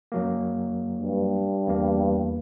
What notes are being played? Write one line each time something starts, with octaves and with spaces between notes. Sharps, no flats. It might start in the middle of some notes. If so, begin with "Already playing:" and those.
F#2 F#3 A#3
G2
E2 A#3